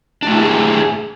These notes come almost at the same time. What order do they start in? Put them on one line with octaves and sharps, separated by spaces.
D4 A3 E4 G4 G#4